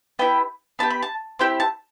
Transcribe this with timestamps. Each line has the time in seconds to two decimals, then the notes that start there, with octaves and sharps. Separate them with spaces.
0.19 B3 E4 G4 G5
0.79 B3 E4 G4 A5
0.90 B5
1.02 A5
1.39 C4 E4 G4 G5
1.60 A5